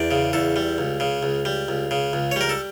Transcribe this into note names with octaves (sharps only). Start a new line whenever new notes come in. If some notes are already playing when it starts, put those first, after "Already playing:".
Already playing: E2 D5
C#3
E2 A4
G3
C#2
C#3
C#2
G3
C#2
C#3
C#2
C#5
G3 A#4
A4